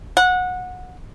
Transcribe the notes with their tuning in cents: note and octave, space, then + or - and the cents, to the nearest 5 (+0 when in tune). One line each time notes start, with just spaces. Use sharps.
F#5 -20